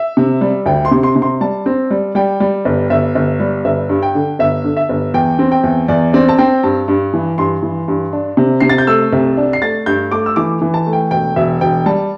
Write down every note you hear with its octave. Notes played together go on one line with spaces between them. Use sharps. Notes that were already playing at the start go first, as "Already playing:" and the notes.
Already playing: E5
C3
G3
D2 G5
C6
C3
C6
C3
C6
G3 A5
C4
G3
G3 G5
G3
G1
G1 E5
G1
G3
G1 E5
G2
G5
D3
G1 E5
D3
E5
G1
E2 G5
C4
G5
E2
E2 D5
C4 D5
A5
C4 G5
G2 A5
G2
E3
G2 C6
E3
G2
D4
C3
C3 C7
A6
G6
A3 E6
C2
D4
C7
A3 A6
G2 G6
A3 D6
E6
E3 D6
E3
A5
A3
G5
E1 G5
E1 E5
E1 G5
G3 A5